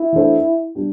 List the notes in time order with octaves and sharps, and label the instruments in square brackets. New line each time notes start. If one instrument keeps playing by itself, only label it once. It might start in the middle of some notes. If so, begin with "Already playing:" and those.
Already playing: [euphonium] E4
[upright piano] E3 A3 D4 A4 C5
G3 D4 G4